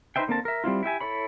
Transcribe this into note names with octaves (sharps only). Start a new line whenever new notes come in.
D#4 B4 C5 E5 G5
D3 A#3 C4 A#4 A5
A#4 E5
G3 C4 E4 F4
E4 G4 E5 G#5
E4 A4 C#5 B5